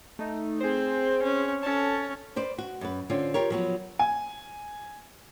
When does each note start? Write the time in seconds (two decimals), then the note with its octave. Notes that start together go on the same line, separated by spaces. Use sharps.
0.19 A3 D#4
0.60 C4 G#4 C5
1.23 C#4
1.63 C#4 A4 A5
2.36 B4 C5 D5
2.58 F#4
2.81 F#2 B4
3.10 D3 C4 C#4 F4
3.34 F4 G4 A#4 C#5
3.50 F3 F#3 B3
3.99 G#5